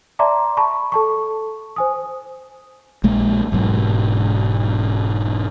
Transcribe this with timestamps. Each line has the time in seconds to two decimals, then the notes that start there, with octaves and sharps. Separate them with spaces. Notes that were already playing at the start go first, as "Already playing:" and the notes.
0.19 D5 E5 A5 A#5 C6 D6
0.57 A5 B5 C#6
0.92 A4 A5 C#6
1.76 C5 G#5 D#6
3.04 A#1 G#3 A#3
3.52 E1 G#2 F#3